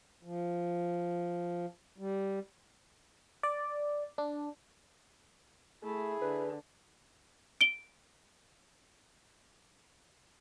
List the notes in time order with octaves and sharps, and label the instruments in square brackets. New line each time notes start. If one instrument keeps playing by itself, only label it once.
[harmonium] F3
G3
[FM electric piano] D5
D4
[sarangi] A3 [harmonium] E4 [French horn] G#4
[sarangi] D3 [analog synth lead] B4
[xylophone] D7 G7